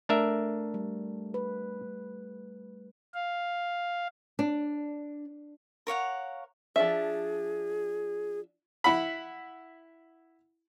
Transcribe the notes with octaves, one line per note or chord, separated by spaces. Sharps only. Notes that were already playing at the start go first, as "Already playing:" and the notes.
A3 D4 A#4 E5
G3
B4
F5
D4
A#4 C#5 F5 F#5
F3 D4 G#4 E5
E4 F#5 B5